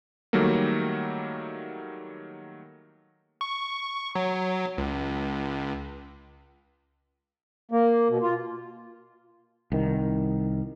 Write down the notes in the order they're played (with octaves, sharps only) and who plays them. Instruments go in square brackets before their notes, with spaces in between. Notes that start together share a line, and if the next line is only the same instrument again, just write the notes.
[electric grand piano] D#3 F#3 G3 A3 A#3
[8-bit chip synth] C#6
F#3
C#2
[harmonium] A#3
B2
F4
[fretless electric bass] C2 D#3